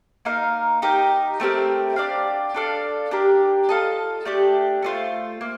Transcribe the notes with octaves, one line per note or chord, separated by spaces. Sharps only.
A#3 D#4 A#4 F5
D#4 G4 A#4
A3 C4 G4 A#4
D4 G4 D5 F5
D4 A4 D5 F5
D4 G4 A#4
F4 A4 D#5 A5
A3 D4 G4
A3 D4 F4 C5
A#3